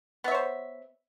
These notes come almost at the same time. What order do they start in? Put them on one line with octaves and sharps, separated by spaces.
B3 E5 C#5 C5